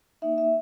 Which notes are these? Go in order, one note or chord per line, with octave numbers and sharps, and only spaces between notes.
A#3 D#4 E5
E5